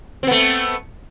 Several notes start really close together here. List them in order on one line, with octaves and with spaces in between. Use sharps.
C4 B3 A3